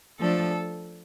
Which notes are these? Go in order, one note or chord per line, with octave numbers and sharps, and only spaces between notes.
F3 A3 D4 A4